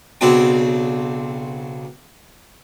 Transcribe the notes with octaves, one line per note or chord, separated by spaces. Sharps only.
B1 C#3 C4 D4 F#4 G5